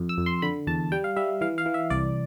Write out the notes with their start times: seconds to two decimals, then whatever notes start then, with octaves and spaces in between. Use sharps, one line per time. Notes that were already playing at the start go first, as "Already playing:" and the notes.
Already playing: F2
0.09 E6
0.18 F2
0.26 C6
0.42 D3 B5
0.67 E2 A5
0.92 G3 G5
1.04 F5
1.16 G3 E5
1.41 E3 F5
1.58 F5
1.66 E3
1.74 E5
1.90 C2 D5